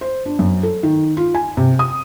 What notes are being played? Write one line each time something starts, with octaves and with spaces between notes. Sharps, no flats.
C5
D4
F#2
A4
D#3
F4
G#5
C3
D#6